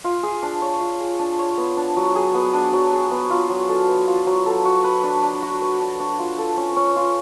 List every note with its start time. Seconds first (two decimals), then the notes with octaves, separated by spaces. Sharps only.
0.04 F4
0.23 G#4
0.43 D4
0.62 C#5
0.81 F4
1.00 G#4
1.19 D4
1.39 C#5
1.57 B3
1.77 D4
1.96 F#3
2.15 G#4
2.34 B3
2.54 D4
2.73 F#3
2.93 G#4
3.11 B3
3.30 F4
3.50 F#3
3.69 A4
3.88 B3
4.07 F4
4.27 F#3
4.46 A4
4.65 F#4
4.84 B4
5.03 D4
5.23 D4
5.42 F#4
5.62 B4
5.80 D4
6.00 D4
6.19 F4
6.38 A4
6.57 C#4
6.76 C#4
6.96 F4